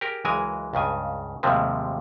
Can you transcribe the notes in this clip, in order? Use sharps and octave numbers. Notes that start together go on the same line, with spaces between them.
G4 G#4 A#4
C#2 E3 F#3 G#3 A#4 G#5
C#2 G2 C#3 G#5
D#2 A2 C3 F3 G3 G#3